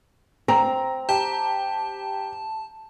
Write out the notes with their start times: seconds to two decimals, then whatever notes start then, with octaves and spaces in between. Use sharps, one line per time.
0.48 C4 A#5
1.09 G4 A5